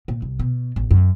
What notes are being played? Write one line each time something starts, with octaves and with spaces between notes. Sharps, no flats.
A#2
C2
B2
A1
F#2